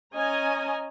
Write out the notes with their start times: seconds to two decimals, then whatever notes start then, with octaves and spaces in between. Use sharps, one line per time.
0.15 C#4 D#5 G#5 A#5